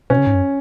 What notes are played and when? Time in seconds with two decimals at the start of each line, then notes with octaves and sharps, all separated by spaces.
0.10 B2 C#4
0.18 C#3
0.27 G#2
0.35 F#2